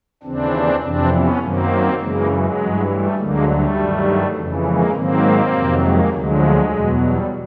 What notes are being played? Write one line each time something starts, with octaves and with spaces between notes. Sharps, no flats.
D#2 C#3 E3 C4 D4
F2 C3 E3 C4 D4
B3 C#4
F#2 D#3 F#3 A#3 C4
F#2 C#3 E3 G#3 A#3
F#3 G#3
G2 E3
G3 A3
D2 D3 F#3 G#3 A#3
G3 A3
G2 D#3 F#3
F2 C#3 E3
G#3 A#3
G#2 D#3 F#3 A#3 C4
F2 C3 D#3 F#3
G#3 A#3
D2 D3 F3 F#3 G#3
E2 B2 F#3
G3